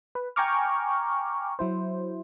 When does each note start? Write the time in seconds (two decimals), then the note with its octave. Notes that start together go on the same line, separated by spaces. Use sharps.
0.15 B4
0.36 G5 G#5 A#5 C#6 D6 F6
1.59 F#3 E4 C5